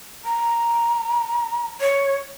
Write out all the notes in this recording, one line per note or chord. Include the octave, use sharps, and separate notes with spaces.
A#5
C#5